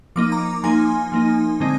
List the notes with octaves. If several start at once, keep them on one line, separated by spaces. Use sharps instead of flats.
F3 A#3 D#4 D6
A#5 D6
F3 A#3 D#4 G#5 C6
F3 A#3 D#4
D3 G#3 C4 D#4